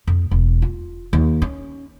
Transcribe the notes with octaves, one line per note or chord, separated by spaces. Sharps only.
F2
E1
F4
D#2
C#4